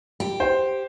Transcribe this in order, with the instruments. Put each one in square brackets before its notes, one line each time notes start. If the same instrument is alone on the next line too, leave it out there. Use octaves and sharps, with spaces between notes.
[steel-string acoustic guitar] G4
[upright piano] C5